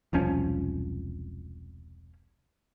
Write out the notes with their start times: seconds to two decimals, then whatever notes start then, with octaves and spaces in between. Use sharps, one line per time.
0.13 E1 C2 F3 C#4